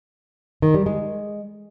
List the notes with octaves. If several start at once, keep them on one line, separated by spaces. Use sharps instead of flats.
D#3
G3
G#3